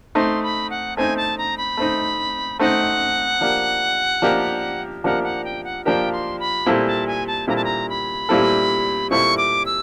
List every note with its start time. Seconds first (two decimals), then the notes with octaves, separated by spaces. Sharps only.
0.15 A3 C4 D#4 C6
0.43 B5
0.70 F#5
0.97 A3 C4 D#4 G#5
1.17 A5
1.38 A#5
1.57 B5
1.77 A3 C4 D#4
2.59 A3 C4 D#4 F#5
3.41 F3 A#3 D4 G4 A#4
4.22 F3 A#3 D4 G4 A#4
5.04 F3 A#3 D4 G4 A#4 F#5
5.23 F#5
5.44 G5
5.64 F#5
5.84 F3 A#3 D4 G4 A#4 G5
6.12 C6
6.39 B5
6.66 A#2 G3 C4 E4 A4
6.86 A5
7.07 G#5
7.27 A5
7.48 A#2 G3 C4 E4 A4 A#5
7.56 A5
7.64 A#5
7.89 B5
8.29 A#2 G3 C4 E4 A4
9.10 A#2 G3 C4 E4 A4 C#6
9.37 D6
9.66 E6